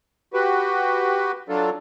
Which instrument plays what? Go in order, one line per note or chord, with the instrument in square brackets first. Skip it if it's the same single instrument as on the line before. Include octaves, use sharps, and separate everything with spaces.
[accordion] F#4 G4 B4
F#3 D4 F4 A4